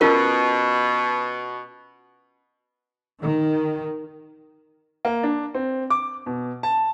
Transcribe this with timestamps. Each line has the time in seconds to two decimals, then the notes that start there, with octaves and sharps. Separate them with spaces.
0.01 B2 C#4 F4 A#4
3.21 D#3
5.05 A#3
5.23 D4
5.54 C4
5.90 D6
6.26 B2
6.63 A5